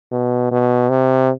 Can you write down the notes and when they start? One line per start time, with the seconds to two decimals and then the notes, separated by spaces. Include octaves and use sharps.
0.11 B2
0.51 B2
0.89 C3